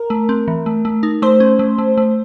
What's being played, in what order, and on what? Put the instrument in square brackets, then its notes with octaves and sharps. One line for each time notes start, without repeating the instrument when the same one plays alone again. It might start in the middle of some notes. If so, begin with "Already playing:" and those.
Already playing: [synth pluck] A#4
[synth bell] A3
C4
E3
A3
A3
D#4
[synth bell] A3 [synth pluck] C5
[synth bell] C#4
A3
A3
A3